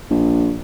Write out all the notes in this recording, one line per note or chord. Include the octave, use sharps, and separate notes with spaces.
A#1